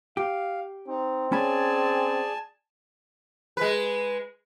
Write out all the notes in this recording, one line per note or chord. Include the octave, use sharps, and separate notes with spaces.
G4 F5
C4 D#4
C#4 G#4 D5 G#5 A5 B5
G#3 B4